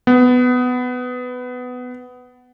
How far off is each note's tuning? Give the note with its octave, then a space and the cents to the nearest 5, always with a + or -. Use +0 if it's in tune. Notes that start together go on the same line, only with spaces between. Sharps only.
B3 +15